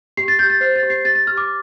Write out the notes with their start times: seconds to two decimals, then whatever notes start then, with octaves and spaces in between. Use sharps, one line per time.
0.17 G4 C7
0.28 A6
0.39 G4 G6
0.50 A6
0.61 C5 C7
0.75 A6
0.83 G4
0.90 C7
1.05 G4 A6
1.15 A6
1.27 G4 F6
1.37 D6